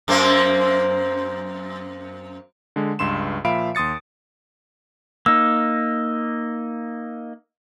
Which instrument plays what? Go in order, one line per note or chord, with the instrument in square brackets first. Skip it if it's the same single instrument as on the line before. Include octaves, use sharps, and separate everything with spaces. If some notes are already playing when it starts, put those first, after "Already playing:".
[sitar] F#2 A#3 C4
[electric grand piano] D3 G#3
C#2 G2 C6 E7
A#2 F3 E5 F5 B5 D7
D#2 C6 D#6 A6 C#7
[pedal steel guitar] A#3 D#4 [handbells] E6